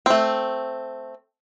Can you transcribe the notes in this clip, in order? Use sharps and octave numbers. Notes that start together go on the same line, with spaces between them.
A3 C4